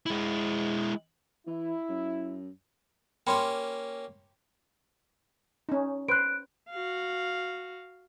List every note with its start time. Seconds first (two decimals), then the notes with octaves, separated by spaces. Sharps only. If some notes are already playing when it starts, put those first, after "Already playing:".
0.06 G#3 E4
1.47 E3 E4
1.89 F#2
3.27 A#3 C#4 G4 G5 B5 C6
5.69 C#4 D#4
6.09 B4 C5 F#6 D7
6.70 F#4 F5